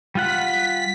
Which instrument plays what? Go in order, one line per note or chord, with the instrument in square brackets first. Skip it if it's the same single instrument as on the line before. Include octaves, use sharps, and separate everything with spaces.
[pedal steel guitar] G3 F4 F#5 [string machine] B6